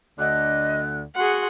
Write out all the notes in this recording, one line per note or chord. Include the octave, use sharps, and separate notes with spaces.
D2 D3 D#5 F#6
F#4 G#4 F#5 C6